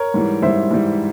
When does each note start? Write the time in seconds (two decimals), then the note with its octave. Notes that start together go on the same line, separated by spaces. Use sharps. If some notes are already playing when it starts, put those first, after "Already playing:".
Already playing: A#4 C#5
0.14 G#2 E3 G3
0.42 G#2 E3 G3 C5 E5
0.71 G#2 E3 G3